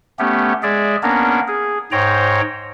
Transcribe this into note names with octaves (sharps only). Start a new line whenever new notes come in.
A3 B3 C#4 G4
G#3 G#4 D5 E5
A#3 B3 C#4 D4 A#4
G#4
G#2 C5 C#5 G5 A#5